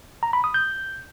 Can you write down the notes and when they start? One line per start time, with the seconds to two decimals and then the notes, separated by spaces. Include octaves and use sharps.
0.23 A#5
0.33 B5
0.44 D#6
0.54 G6